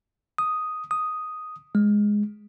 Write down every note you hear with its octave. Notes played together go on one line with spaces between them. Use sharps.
D#6
D#6
G#3